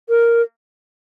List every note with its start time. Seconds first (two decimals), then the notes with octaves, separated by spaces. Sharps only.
0.09 A#4